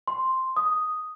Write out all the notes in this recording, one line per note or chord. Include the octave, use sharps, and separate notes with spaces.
C6
D#6